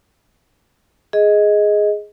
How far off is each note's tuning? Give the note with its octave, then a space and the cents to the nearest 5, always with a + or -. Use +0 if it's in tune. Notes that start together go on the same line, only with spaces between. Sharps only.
G#4 +5 D#5 +10